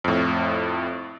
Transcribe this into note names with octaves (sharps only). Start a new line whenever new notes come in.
F2 A2